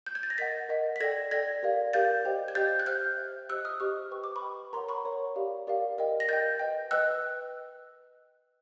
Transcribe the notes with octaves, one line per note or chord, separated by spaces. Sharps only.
G6
G#6
A6
A#6
A#4 D#5 F#5 A6 B6
A#4 D#5 F#5
B6
A4 D5 G5 G#6 A#6
A4 D5 G5 G#6 A#6
G4 A#4 D5 F5
G4 A#4 D5 F5 G6 A6
G4 C5 D#5 G5
G#6
G4 C5 D#5 G5 G6 A6
F#6
C5 E5 G5 F6 G6
C5 E5 G5
G4 C5 D#5 E6 F#6
D#6 F6
G4 C5 D#5 C#6 D#6
B4 D#5 G5 C#6
D6
B5 C#6
B4 D#5 G5
A#4 C#5 F#5 A#5 C6
B5 C#6
A#4 C#5 F#5
G4 A#4 D5 F5
G4 A#4 D5 F5
A#4 D#5 G5
A#6
A#4 D#5 G5 G6 A6
B4 D#5 G5
B4 D#5 G5 E6 F#6